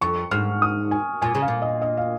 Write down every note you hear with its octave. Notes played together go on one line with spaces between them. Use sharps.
F2 C#6
G#2 F6
D#6
G#5
A#2 G#5
C#3
F5
A#2
D#5
D#5
F5